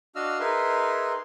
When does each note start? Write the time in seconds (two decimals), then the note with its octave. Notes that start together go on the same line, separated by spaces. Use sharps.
0.15 D4 F#4 D#5 F5 E6 F6
0.40 D#4 G#4 A#4 B4 E5 C6